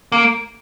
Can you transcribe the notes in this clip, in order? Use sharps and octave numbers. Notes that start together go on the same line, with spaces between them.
A#3